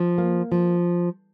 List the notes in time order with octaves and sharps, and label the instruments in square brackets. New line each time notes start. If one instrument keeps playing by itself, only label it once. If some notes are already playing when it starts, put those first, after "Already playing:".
Already playing: [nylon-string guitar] F3
A#3
F3